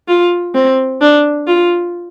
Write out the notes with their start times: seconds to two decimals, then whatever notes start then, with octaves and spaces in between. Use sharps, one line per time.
0.08 F4
0.55 C4
1.01 D4
1.47 F4